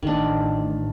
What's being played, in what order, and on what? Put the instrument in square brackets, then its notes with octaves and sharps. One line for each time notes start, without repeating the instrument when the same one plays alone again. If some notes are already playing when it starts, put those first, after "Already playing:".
[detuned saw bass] A1 [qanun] D#3 D4